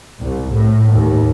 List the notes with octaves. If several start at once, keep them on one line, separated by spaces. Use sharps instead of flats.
C2
A2
D#2